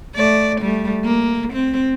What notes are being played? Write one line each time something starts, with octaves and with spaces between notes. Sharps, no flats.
A3 D5
G3 A3
A#3
C4